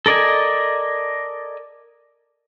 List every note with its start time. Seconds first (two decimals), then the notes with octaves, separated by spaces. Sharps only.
0.06 A4 A#4 D5 D#5 G#5